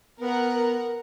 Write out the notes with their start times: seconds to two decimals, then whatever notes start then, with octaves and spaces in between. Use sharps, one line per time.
0.20 B3 A#4 F#5